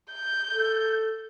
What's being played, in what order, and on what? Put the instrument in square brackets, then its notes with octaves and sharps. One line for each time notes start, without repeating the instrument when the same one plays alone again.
[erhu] G6
[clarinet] A4